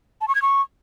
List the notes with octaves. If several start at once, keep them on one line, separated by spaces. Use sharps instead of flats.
A5
C#6
G#6
C#6